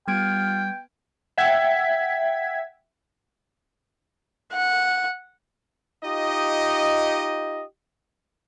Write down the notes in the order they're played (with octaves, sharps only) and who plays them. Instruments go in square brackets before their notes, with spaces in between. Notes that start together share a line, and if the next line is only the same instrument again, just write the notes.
[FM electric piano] G3 [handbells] B3 G#6 D7 [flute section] F4 F6 [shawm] G5
[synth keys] E5 F#5 G5 G#6 B6
[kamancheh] F#5
[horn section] D#4 F4 G4 D#5